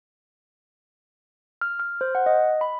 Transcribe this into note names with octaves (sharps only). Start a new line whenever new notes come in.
F6
F6
C5
F#5
D#5
B5